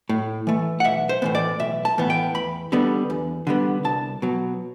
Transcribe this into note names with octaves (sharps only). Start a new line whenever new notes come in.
A2
E3 A3
F#5
B1 E5
C5
A2 E3 B3
D5
B1 E5
A5
A2 E3 B3
G5
E2 B5
D3 G3 B3
E2
D3 G3 B3
C2 A5
B2 F#3